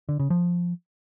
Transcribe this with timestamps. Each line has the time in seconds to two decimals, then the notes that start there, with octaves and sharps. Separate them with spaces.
0.09 D3
0.19 C#3
0.30 F3